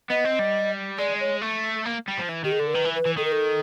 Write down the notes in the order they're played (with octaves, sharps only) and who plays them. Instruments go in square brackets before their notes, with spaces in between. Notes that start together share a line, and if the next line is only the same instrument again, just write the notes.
[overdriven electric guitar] B3 [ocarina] D#5
[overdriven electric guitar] C4
G3
[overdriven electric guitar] G#3 [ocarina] D5
[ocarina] C#5
[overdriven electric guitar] A3
A#3
G3
F3
E3
[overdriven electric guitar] D#3 [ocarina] G4
[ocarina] G#4
[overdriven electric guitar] D3 [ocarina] A4
[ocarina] A#4
[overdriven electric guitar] D#3 [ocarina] B4
[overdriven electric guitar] E3
[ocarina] B4
[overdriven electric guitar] E3
[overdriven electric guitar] D#3 [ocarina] A4
[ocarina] A#4
A4